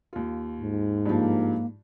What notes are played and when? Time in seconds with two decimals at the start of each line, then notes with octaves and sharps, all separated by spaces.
0.13 D#2 F4
0.61 G#2
1.05 G2 F3 A#3